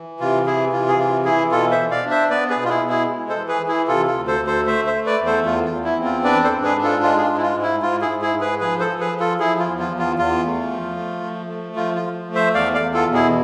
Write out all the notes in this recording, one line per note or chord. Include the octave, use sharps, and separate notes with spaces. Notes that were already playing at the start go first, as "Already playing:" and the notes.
Already playing: E3
C3 F4
E3 E4 G#4
C3 F4
G#4
E3 F4
E3 E4 G#4
B2 F4 A4
C5 E5
B2
D5 F5
D4
C5 E5
B3 B4 D5
G#4 B4
B2
F4
E4 G#4
B2
E4 G#4
G#3
A4 C5
E3
G#4 B4
E3
E4 G#4
C3 F4 A4
F4 A4
D2
A4 C5
D2
A4 C5
A3 C5 E5
C5 E5
A3
B4 D5
E2
A4 C5
E2 F4
F4
E2
E4
C4
F4
D4 B4 D5
A4 C5
G#2
G#4 B4
D4
F4 A4
G#3 F4
G#4
F4
G#2
E4
F4
G#2
E4
G#2 F4
E4 G#4
G#2
E4 G#4
G#2
G#4 B4
F3 G#4 B4
A4 C5
F3
G#4 B4
F3
F4 A4
F3 E4 G#4
F4
E2
F4
E2
F4
E2 F4
A3
F3
A3
F3
A3
F3 F4
F4
F3
A3
C5 E5
E2 D5 F5
D5 F5
E2
F4 A4
B2
E4 G#4